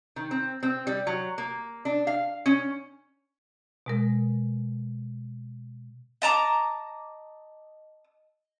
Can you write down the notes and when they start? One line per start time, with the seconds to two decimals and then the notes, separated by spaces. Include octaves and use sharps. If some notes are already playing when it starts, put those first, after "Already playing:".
0.16 D#3
0.31 C4
0.63 C4
0.87 G3
1.07 F#3
1.38 A#3
1.85 D4
2.07 F5
2.46 C#4
3.86 B2 G#3 A#4
6.22 D#5 A5 A#5 D6